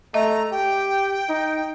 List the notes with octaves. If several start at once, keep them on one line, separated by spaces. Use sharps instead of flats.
A3 D#5 E5 A#5
G4 G5
D#4